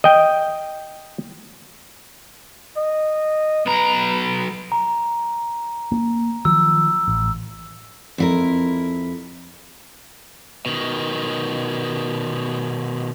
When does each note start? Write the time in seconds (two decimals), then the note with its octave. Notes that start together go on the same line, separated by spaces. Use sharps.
0.04 D#5 G5
2.77 D#5
3.66 B1 B4 A#5
4.72 A#5
5.92 A#3
6.45 D#3 F3 F#3 E6
7.08 A1
8.18 F2 E4 A#4
10.66 B2 D#3